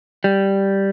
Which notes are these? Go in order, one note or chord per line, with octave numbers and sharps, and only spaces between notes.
G3